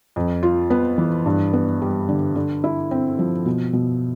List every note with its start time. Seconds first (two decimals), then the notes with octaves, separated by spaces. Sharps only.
0.16 F2
0.43 F4
0.70 B3
0.98 E3
1.26 G2
1.53 B3
1.82 G3
2.08 D3
2.35 D3
2.64 E4
2.91 C4
3.19 F3
3.46 B2
3.73 B2